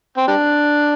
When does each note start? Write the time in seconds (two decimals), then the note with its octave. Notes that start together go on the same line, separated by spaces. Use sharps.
0.17 C4
0.28 G3 D4